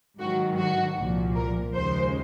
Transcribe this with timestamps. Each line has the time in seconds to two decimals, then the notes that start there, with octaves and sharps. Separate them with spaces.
0.19 G#2 D#3 F#3 F#4
0.58 F#4
0.97 C2 A#2 F3
1.35 A#4
1.74 D#2 C#3 F3 G#3 C5